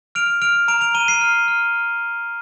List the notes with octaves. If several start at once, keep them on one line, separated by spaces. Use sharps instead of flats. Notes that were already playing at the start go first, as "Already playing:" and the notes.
F6 D7 F7
F6 D7 F7
A#5 D7 F7
D7 F7
A#5 D#7 G7
C7 D#7
F6
F6